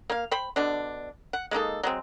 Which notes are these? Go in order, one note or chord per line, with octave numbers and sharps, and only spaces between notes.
A#3 F5
C5 G5 B5
B2 D3 D4
F#5
G#3 A#3 D#4 A4
F#3 G#3 C4